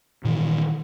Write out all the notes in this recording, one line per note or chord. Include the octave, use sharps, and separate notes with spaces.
A#2 D#3 E3